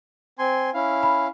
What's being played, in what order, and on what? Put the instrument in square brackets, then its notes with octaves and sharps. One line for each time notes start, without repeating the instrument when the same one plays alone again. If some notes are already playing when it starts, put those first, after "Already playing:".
[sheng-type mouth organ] C4 G#5 C6
C#4 E4 F5
[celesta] B5